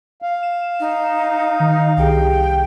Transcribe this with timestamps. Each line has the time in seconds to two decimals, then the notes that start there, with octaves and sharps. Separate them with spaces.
0.22 F5
0.43 E7
0.80 D#4
1.60 D#3
1.97 C2 G4 G#4 G5